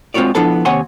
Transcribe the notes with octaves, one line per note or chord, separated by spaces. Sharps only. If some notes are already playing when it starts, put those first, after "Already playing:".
G#3 C4 F4 F#4 C#5 D5
F3 B3 D4 E4 A4 A5
D#2 C3 C#5 F#5 G#5 C6